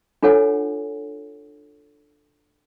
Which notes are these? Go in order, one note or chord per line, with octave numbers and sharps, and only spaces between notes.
D4 F4 A4 C#5 F#5 G#5